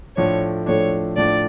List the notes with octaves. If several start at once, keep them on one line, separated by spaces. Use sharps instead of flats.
A2 F3 A3 D4 C#5
A2 F3 A3 D4 C#5
A2 F3 A3 D4 D5